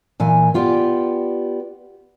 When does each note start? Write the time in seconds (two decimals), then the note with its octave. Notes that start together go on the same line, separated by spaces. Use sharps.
0.20 A#2 E3 G#5
0.54 B3 F4 G4 D5